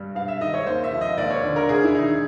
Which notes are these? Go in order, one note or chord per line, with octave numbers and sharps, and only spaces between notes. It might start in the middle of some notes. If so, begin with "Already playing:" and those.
Already playing: G2 G3
G2 F5
E5
D#3 D#5
C#5
D#2 C5
E5
F3
D#5
D#2 D5
C#5
D3
A#4
D2 G#4
E4
D#3 D#4